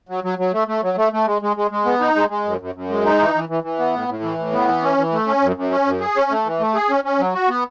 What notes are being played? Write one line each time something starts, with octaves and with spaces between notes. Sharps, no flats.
F#3
F#3
F#3
A3
A3
F#3
A3
A3
G#3
G#3
G#3
G#3
B3
D#4
G#3
G#3
F#2
F#2
F#2
G#3
D#4
E3
E3
E3
E3
B3
A2
A2
E3
A2
B3
E3
C#4
E3
A3
C#4
F#2
F#2
C#4
F#2
G#4
C#4
A3
E3
A3
G#4
C#4
C#4
F#3
F#4
B3